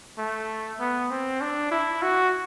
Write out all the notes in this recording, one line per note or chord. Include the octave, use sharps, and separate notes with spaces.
A3
B3
C4
D4
E4
F#4